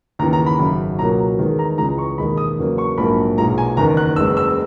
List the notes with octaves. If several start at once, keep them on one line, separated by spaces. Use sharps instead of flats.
D#2 C#3 E3 A#5
A#5
B5
G#1 F#2 C#3
C#2 B2 F#3 A#3 A#5
E2 D#3 G#3
A#5
C#2 C#3 E3 G#3 A#5
C#6
E1 D#2 D#3 G#3 B5
D#6
E2 C#3 F#3 A#3
C#6
A#1 G#2 F#3 A#3 B5
B1 A#2 G#3 A#5
G#5
F#1 E2 D#3 A#5
F#6
F#1 E2 C#3 G#3 E6
E6